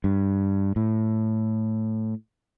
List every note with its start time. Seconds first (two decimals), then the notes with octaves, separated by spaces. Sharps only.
0.04 G2
0.76 A2